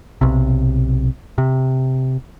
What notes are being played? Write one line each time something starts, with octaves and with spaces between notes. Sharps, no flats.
B1 C3
C3